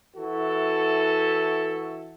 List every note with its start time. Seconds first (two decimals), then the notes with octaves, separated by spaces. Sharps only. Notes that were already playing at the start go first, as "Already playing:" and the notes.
0.16 E3 E4 F#4 A4